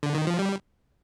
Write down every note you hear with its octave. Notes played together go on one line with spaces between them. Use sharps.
D3
D#3
F3
G3